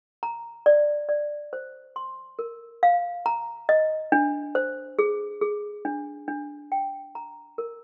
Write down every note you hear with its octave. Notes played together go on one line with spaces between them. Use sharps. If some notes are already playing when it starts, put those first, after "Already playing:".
A#5
D5
D5
C5
C6
A#4
F5
A#5
D#5
D4
C5
G#4
G#4
D4
D4
G5
A#5
A#4